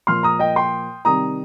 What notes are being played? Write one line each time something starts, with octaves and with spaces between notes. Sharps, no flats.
A#2 F3 C6 F6
A#5 D#6
D#5 G5
G5 C6
C3 D#3 G3 A#5 D#6